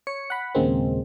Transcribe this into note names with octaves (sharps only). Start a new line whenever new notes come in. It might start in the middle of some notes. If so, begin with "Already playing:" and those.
C#5 C#7
F#5 B5
D#2 A#2 C#3 G#3 A#3 C4